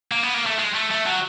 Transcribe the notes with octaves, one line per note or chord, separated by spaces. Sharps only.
A#3
B3
A#3
A3
G#3
A3
A3
F#3